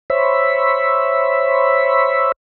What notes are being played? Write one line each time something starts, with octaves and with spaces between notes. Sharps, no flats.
C5 C#5 E5 B5